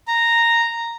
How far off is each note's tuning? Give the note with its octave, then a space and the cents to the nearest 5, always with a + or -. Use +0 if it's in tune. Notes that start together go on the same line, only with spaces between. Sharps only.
A#5 -5